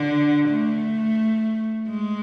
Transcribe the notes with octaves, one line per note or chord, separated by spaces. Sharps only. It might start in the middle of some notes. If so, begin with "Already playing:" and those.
Already playing: D3
A3
G#3